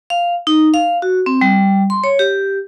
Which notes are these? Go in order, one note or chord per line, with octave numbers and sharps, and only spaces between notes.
F5
D#4
F5
F#4
C4
G3
C6
C#5
G4